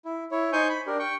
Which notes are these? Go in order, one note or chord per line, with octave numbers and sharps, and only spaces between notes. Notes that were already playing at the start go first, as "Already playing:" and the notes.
E4
E4 C#5
D#4 C5 G#5 C#6 G6
B5
D4 G4 A#4
G5 C#6